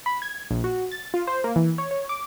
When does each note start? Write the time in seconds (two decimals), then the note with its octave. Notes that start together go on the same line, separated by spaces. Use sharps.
0.06 B5
0.22 G#6
0.51 A#1
0.64 F#4
0.92 A6
1.14 F4
1.27 C5
1.44 A#3
1.56 E3
1.78 C#5
1.91 C#5
2.09 D6